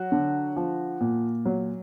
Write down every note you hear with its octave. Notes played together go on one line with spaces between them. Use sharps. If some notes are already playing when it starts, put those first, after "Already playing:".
Already playing: F#3 F#4
D3
F3
A#2
F#3